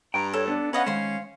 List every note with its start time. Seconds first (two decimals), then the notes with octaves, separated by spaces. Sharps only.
0.14 G2 G5 A#5
0.33 A4 C#5
0.48 B3 D4
0.73 C#4 B4 D#5 F5 F#5
0.86 D#3 G#3 C5 F5 C6